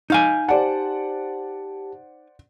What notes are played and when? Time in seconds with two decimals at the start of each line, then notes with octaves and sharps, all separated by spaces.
0.10 D#4 F5 G#5 G6
0.49 G4 C5 D5 F#5 A5